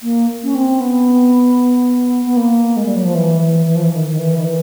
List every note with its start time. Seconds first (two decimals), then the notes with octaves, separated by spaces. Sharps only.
0.03 A#3
0.43 C#4
0.55 C4
0.81 B3
2.26 B3
2.37 A#3
2.76 G#3
2.86 G3
2.96 F#3
3.05 F3
3.15 E3
3.41 E3
3.67 E3
3.76 F3
3.84 E3
3.93 D#3
4.11 D#3
4.19 E3
4.37 D#3
4.45 E3